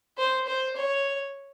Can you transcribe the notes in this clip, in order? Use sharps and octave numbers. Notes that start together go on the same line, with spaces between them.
C5
C5
C#5